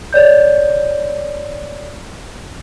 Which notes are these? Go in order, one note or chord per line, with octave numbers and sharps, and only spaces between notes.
C#5 D5 G6